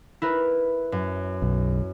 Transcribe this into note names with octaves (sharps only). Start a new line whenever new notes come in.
E4 A#4 B4
F#2
B1